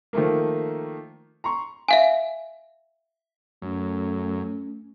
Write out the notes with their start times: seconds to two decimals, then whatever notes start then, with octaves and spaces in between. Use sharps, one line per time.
0.13 D#3 F3 A3 A#3
1.44 A#5 C6 C#6
1.88 E5 F5 G#5
3.62 F#2 A3 C#4